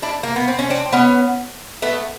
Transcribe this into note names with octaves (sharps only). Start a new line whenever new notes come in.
D4 E4
A#3
B3
C4
C#4
C4 D4
C4
B3 C#4
A3 B3